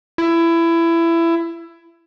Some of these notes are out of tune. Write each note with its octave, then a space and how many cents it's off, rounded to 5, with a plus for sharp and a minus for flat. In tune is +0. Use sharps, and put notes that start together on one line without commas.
E4 +20